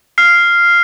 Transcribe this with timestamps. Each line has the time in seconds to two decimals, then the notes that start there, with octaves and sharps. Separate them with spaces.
0.18 F6 C7